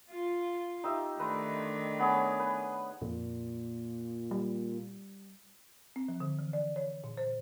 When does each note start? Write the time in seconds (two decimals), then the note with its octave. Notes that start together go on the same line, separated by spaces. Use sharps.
0.10 F4
0.84 D#4 G4 E5
1.19 D#3 A3 D4 B4 A#5 C6
1.99 B3 G#4 C#5
2.39 B4
3.02 F2 A#2
4.31 G3
5.96 C4
6.08 F3
6.20 D3
6.39 E3
6.53 D5
6.76 C#5
7.04 A#2
7.17 C5